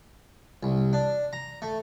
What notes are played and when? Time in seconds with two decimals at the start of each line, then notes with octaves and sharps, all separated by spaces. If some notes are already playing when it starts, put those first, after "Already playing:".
0.63 C2
0.93 D4
1.33 A#5
1.62 A3